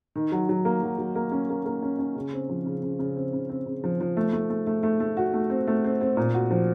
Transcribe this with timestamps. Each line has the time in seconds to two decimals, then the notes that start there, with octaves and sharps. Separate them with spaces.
0.16 D#3
0.32 F#3
0.49 F#3
0.65 A#3
0.82 F#3
0.98 F#3
1.15 A#3
1.32 C#4
1.50 A#3
1.66 A#3
1.82 C#4
1.99 C#4
2.16 C#3
2.33 C4
2.49 F3
2.66 C#3
2.83 C#3
2.99 C#3
3.16 C4
3.33 C#3
3.49 C4
3.66 C#3
3.84 F3
4.00 F3
4.17 A3
4.33 A3
4.50 A3
4.67 A3
4.83 A3
5.00 A3
5.17 F#4
5.34 A3
5.50 C4
5.67 A3
5.84 C4
6.01 C4
6.17 A#2
6.34 F#4
6.51 F3